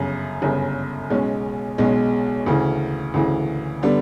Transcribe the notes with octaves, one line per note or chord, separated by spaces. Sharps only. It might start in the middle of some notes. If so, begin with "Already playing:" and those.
Already playing: G1 F#2 C#3
G1 F#2 C#3
B1 B2 G#3 C#4
B1 B2 G#3 C#4
D2 C#3 E3
D2 C#3 E3
D3 G3 B3 D4